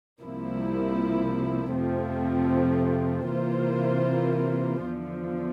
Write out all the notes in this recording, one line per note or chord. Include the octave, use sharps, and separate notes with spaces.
C2 C3 F3 A#3 E4
F2 C3 F3 A3 C4
C3 E3 A#3 F4 C5
E2 D3 F3